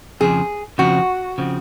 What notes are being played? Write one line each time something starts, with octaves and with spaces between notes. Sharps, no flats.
F2 C#3 F3 C4 G#4
F2 C#3 F3 C4 F#4
C#3 F3 C4